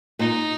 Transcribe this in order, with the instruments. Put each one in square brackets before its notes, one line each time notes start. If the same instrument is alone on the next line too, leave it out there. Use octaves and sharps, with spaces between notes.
[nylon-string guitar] A#2 [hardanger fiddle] D#4